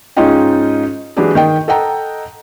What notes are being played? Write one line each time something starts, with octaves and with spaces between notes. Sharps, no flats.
G#2 C#4 D#4 F4 D#5 G5
E3 F#3 G#3 D4 G4 G#4
D#3 D#5 G5
A4 D#5 F#5 G5 A#5